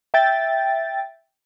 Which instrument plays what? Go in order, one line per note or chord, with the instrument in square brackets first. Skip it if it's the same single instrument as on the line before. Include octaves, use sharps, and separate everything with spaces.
[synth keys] E5 G5 A6